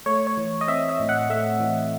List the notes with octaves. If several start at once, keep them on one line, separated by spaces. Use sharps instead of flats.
A3 C#5
C#5
E3
D#5
C4 E5
E5
A2
F#5
A3 E5
E3